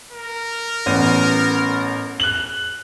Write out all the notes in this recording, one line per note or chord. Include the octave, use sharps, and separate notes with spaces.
A#4
A1 B3 D#7
F#6 F#7